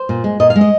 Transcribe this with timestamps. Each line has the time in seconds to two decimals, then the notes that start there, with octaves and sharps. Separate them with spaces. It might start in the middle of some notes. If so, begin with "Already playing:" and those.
Already playing: C5
0.09 A#2
0.24 G#3
0.40 A#2 D#5
0.50 F5
0.56 G#3
0.61 D#5